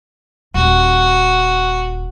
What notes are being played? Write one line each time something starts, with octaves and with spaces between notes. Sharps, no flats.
D#1 F#4